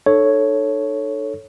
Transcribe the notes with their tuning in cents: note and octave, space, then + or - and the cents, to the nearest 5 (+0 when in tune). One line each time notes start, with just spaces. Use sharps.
D#4 -45 A4 +0 C#5 +0